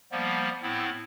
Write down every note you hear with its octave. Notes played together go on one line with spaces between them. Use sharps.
F3 G3 A#3 B3
A2 B3 C4 E4